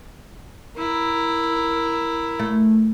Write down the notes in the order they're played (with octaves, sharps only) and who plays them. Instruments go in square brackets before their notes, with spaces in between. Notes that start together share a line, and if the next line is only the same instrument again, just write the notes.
[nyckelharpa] E4 A#4
[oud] A3